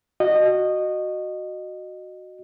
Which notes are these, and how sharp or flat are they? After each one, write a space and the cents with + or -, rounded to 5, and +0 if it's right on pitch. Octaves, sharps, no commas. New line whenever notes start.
F#4 +0 D#5 -20